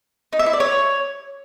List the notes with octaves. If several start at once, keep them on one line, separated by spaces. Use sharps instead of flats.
D#4
E5
E4
D5
C#5